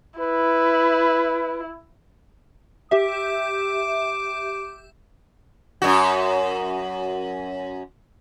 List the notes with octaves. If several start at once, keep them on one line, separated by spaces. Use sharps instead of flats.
E4 B4
G4 E5 D6
F#2 F#4